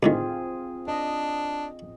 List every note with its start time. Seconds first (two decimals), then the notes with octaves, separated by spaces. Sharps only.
0.03 D2 A2 D#3 C4 F4 G#4
0.88 D4 D#5